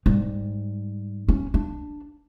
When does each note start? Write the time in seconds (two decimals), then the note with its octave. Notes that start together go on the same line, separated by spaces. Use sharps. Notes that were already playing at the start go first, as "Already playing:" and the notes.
0.06 G#2 G3
1.29 C#4
1.54 D4